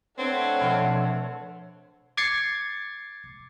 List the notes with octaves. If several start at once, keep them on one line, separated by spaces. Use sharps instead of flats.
A3 C4 D4 B4 C#5 F#5
B2 F3
D6 G#6 A6 C7 C#7